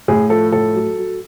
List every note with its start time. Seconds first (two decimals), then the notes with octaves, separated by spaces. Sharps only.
0.08 A2 G#4
0.30 F3 A4
0.52 A2 A4
0.74 F#3
0.98 F#3